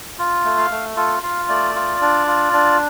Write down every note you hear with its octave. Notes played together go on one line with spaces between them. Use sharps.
F4
A3
F5
A3
F4 A4
F4 F5
A3 D5
F4
D4
F4
D4